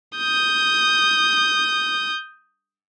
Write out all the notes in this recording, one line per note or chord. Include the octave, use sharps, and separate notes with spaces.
D#6 G6